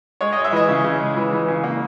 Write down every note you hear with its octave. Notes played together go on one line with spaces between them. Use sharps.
G#3 C#5
G#3 D#5
E5
E3 D#5
C#3
C#3
G#3
E3
E3
C#3
A#3